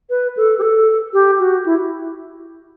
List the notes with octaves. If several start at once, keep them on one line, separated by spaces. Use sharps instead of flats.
B4
A4
G4
A4
G4
F#4
E4